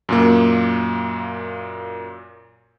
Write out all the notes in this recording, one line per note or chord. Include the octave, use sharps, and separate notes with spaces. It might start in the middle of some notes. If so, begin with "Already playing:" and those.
F#2 A#2 A#3